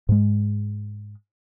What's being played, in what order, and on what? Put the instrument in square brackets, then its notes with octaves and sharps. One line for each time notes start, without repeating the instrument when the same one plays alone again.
[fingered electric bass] G#2 G#3